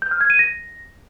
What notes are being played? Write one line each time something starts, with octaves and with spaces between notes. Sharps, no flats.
G6
F6
G#6
D#7
A#6